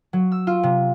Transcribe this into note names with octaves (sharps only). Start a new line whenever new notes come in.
F#3
E6
F4
C3